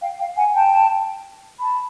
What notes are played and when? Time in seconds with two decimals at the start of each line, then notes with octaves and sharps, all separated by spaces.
0.01 F5 G5
0.18 F5 G5
0.37 F#5 G#5
0.54 G5 A5
1.59 A5 B5